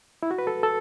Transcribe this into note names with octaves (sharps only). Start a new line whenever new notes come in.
E4
F#4
B4
A4
A4